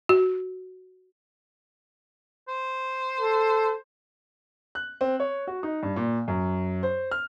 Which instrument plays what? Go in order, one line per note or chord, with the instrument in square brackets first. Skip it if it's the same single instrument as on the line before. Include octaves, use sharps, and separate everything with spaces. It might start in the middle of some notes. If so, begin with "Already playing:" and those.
[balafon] F#4
[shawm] C5
[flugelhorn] A4
[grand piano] F#6
C4
C#5
F#4
D#4
G2
A#2
F#2
C5
F6